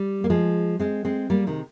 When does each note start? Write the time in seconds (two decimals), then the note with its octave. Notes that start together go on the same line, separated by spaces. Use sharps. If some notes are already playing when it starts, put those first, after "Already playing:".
Already playing: G3
0.24 A#3
0.30 F3 G#3
0.79 G#3 C4
1.05 G#3 C4
1.30 G3 A#3
1.47 C3 D#3